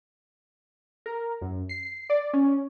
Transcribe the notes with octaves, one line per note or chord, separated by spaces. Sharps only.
A#4
F#2
C7
D5
C#4